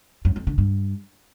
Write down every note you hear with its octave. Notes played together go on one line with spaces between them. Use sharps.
F#2
F2
D3
G2